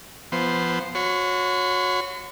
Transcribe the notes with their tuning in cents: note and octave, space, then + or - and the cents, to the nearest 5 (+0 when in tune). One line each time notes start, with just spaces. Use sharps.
F3 -25 B3 +0 C5 +0
F#4 -25 C#5 +0 B5 +45